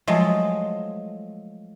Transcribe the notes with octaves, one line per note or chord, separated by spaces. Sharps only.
F3 F#3 G#3 A3